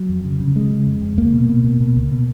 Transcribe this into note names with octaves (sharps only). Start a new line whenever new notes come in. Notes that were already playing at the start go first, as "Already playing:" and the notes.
Already playing: F#3
F2
C#3
C#3
C#3 G#3
C#3
F2
F2
C#2 A#3
B2
B2
B2
B2
C#2
B2